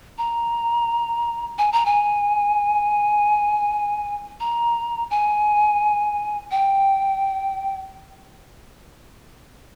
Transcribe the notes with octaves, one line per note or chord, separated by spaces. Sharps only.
A#5
G#5
A#5
G#5
A#5
G#5
G5